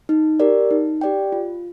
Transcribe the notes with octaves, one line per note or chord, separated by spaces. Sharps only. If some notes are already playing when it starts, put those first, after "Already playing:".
D#4
G4 A#4 D5
D#4
G4 D5 G5
F4